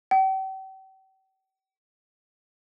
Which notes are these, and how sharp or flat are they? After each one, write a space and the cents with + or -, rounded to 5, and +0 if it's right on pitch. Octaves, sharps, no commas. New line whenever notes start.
G5 -40